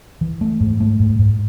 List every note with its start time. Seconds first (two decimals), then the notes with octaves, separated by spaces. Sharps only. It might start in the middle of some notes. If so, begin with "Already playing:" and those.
0.21 E3
0.41 A3
0.60 G#2
0.80 A3
1.00 G#2
1.19 G#2